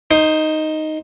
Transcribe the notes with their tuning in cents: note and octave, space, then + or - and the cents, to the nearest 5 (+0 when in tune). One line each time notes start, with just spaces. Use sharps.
D#4 +0 C5 +10